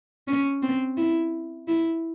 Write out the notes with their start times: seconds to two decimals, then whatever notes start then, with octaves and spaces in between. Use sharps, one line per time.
0.28 C#4
0.62 C4
0.97 E4
1.68 E4